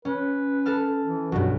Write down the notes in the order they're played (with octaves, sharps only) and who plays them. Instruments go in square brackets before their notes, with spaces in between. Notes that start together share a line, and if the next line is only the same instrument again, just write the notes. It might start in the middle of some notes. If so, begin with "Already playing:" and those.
[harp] C#4 [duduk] B4
[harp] A4 A5 F6
[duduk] E3
[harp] B1 G2 [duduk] F#4